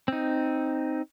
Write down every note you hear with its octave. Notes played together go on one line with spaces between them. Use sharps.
C4 D#4